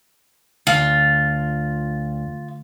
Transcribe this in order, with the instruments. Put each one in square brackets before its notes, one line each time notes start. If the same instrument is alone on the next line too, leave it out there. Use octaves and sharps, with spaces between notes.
[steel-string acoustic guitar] D2 [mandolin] F4